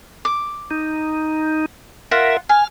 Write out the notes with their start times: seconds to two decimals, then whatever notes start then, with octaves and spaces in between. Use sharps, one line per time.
0.25 D6
0.71 D#4
2.11 F4 A#4 E5 F#5
2.49 G#5 F6